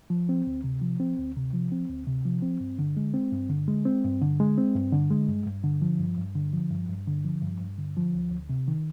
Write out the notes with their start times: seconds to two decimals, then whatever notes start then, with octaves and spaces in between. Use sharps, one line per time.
0.10 F3
0.29 C4
0.47 D2
0.64 C3
0.82 F3
1.00 C4
1.18 D2
1.36 C3
1.53 F3
1.72 C4
1.89 D2
2.07 C3
2.26 F3
2.42 C4
2.60 G2
2.79 D3
2.97 G#3
3.14 C4
3.31 G2
3.50 D3
3.68 G#3
3.85 C4
4.04 G2
4.21 D3
4.40 G#3
4.58 C4
4.75 G2
4.92 D3
5.11 G#3
5.29 G2
5.46 G2
5.64 D3
5.82 F3
5.99 G2
6.18 G2
6.35 D3
6.53 F3
6.71 G2
6.89 G2
7.07 D3
7.25 F3
7.42 G2
7.60 G2
7.78 D3
7.97 F3
8.15 D2
8.32 D2
8.49 C3
8.68 D#3